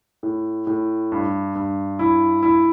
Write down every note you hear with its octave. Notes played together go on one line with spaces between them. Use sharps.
A2
A2
G2
G2
E4
E4